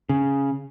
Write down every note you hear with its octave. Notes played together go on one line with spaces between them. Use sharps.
C#3